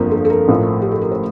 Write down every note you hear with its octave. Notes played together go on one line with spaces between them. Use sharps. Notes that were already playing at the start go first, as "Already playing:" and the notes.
Already playing: G1 F2 D3 F3 A#3 A#4 C5
A4
A4
A#4
A1 A2 F3 A3
G4
A4
A#4
C5